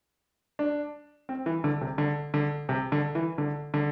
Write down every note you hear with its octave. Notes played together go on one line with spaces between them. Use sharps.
D4
C4
E3
D3
C3
D3
D3
C3
D3
E3
D3
D3